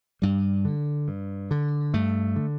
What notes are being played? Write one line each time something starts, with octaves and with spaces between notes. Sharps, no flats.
G2 G3
D3
G2
D3
G2 A3
D3